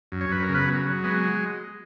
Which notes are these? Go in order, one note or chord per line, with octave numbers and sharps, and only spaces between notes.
F#2
C#5
F#2 B4
A#4
C#3
B3 B4
F#3
F#3
G#3 B3